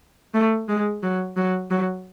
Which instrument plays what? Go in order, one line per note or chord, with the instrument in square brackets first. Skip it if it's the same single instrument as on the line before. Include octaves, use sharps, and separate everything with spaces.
[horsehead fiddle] A3
G#3
F#3
F#3
F#3